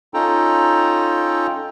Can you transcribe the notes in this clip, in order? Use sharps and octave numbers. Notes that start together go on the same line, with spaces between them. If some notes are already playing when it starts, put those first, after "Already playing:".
C#4 D#4 F4 A4 G5 A#5